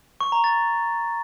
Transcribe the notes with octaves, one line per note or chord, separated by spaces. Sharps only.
C#6
A#5
A6